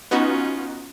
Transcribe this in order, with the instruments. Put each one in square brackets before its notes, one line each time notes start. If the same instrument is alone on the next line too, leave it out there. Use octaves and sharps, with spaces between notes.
[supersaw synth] B3 D#4 F#4 [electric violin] C#4 F4